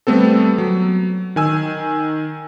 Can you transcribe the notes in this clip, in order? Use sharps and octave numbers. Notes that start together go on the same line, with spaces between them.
G3 A3 B3 C4 A4
F#3
D#3 G#5 E6